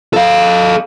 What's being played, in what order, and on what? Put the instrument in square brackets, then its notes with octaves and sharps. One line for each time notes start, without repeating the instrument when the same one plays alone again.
[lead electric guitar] A4 F5